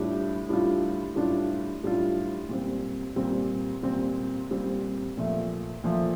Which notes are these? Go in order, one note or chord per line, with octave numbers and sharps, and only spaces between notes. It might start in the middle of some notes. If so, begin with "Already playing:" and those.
Already playing: A2 G3 D4 F4
A2 G3 D4 F4
A2 G3 D4 F4
A2 G3 D4 F4
A#2 G3 C4
A#2 G3 C4
A#2 G3 C4
A#2 G3 C4
A#2 F3 A3
A#2 F3 A3